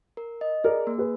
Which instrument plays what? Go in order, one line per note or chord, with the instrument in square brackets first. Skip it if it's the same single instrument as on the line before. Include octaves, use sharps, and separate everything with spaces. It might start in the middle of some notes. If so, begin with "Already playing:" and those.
[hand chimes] A#4
D#5
[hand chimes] G#4 [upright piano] A#4 D5
[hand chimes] A#3
[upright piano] G#4 B4